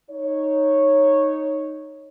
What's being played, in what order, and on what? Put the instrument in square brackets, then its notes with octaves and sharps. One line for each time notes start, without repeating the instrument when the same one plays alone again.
[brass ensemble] D#4 C#5